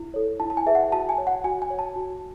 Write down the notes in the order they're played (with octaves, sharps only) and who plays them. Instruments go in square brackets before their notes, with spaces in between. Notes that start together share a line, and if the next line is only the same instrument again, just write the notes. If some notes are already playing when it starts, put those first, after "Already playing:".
Already playing: [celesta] E4
A4 C#5
E4 A5
A5
G#5
G#4 B4 E5
F#5
F#4 A5
G#5
C#5
F#5
F#4 G#5
G#5
C#5
A5
F#4